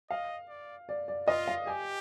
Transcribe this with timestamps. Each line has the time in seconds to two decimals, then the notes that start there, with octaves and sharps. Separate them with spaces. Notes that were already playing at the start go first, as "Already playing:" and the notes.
0.10 D#5 F5
0.49 D5
0.89 D5
1.08 D5
1.28 F4 D#5
1.47 F5
1.67 G4 G#5